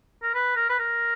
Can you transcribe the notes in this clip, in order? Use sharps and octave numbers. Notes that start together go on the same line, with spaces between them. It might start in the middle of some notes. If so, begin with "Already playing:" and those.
A#4
B4
A#4
B4
A#4